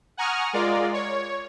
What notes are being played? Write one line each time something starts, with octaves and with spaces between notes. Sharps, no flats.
F#5 G#5 A#5 C#6 D#6 F6
G#3 F4 A#4 D5
C#5